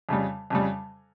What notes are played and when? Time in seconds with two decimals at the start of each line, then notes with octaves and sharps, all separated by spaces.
0.09 F2 C#3 G3
0.50 F2 C#3 G3